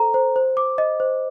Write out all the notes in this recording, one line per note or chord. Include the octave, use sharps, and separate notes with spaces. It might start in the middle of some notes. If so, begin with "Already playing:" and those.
Already playing: A4 C5 A#5
C5
C5
D6
D#5
C5